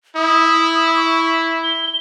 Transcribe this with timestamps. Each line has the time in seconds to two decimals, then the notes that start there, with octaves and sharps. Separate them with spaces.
0.16 E4 D#6
0.96 C#6
1.26 B6
1.64 G7